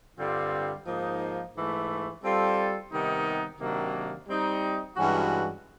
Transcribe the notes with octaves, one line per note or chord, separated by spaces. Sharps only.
G2 D3 G3 C4 F4
G#2 F3 A#3 D#4
G#2 E3 A3
G3 C4 F4 A4
C3 D#3 G3 B3 D#4
C3 D#3 F#3 A#3 D4
G3 C4 D#4
G2 E3 G#3 C#4 F#4